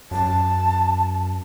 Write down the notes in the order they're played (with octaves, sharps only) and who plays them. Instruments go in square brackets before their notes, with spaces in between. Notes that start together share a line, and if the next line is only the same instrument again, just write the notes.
[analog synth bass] F#2 [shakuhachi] A5